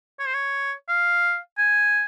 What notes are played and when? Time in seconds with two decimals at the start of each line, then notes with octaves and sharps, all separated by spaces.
0.19 C#5
0.27 C5
0.34 C#5
0.89 F5
1.58 G#5